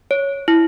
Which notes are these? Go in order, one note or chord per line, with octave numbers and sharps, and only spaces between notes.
C#5
E4